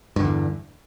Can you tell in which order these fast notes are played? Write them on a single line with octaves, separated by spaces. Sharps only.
G2 D3 E2